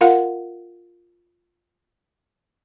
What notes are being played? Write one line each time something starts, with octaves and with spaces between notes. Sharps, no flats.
F4 A#4 F5 F#5